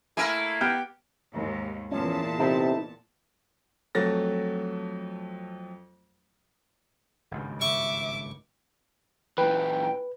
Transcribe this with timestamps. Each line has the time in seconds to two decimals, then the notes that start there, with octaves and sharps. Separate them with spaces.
0.17 A3 A#3 E4 A#4 G#5
0.61 B3 G4 F6 G6 D7
1.32 D#2 G#2
1.91 E2 A#2 F3 C#4 A5
2.39 C3 D#4 E4 A4
3.95 F2 F#3 A3 A4 A6 A#6
7.31 G#1 C#2 G2
7.61 E5 C#6 D6
9.38 A#2 E3 B4 G5